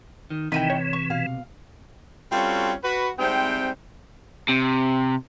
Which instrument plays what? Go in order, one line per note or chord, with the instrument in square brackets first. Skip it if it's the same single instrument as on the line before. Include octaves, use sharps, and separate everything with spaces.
[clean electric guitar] D#3
[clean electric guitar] C3 [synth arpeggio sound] D#3 D#7 [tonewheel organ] E3 [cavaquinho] D#4 E4 G5
[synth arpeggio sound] C#5
[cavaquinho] C#6
[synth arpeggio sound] B2 [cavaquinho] F5
[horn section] G3 C4 C#4 F4 F#4 A4
F#4 B4
G#2 C3 G3 C4 G5
[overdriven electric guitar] C3